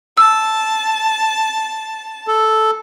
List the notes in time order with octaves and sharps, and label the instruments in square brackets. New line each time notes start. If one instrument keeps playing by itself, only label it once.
[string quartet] A5 [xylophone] E6
[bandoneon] A4